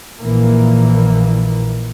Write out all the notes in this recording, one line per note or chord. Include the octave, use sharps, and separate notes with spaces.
A#1 A#2 E3 A#3